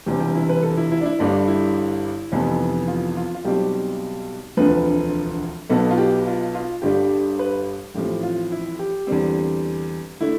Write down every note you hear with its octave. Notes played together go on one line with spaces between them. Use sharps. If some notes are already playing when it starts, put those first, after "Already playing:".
E1 E2 C3 E3 G3 G4
G4
E4
B4
A4
E4
E4
D4
E4
G1 G2 D3 G3 D4
E4
F1 F2 C3 E3 B3
F4
F4
F4
B1 B2 G3 C4 G4
E1 D2 D3 F3 C4 B4
B1 B2 B3 A4
F4
G4
F4
F4
G1 G2 D3 G3 G4
B4
A1 A2 F3 C4 G4
F4
E4
G4
E2 D3 G3 C4
D3 A3 E4